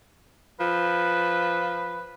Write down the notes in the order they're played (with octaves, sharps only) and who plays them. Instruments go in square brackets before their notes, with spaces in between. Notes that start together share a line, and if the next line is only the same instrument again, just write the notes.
[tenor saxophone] F3 [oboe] B4